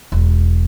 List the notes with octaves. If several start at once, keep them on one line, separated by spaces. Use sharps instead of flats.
E1